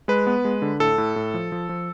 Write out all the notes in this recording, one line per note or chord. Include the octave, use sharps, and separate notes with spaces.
G#3 B4
B3
G#3
D3
A2 A4
A2
A2
F3
F3
F3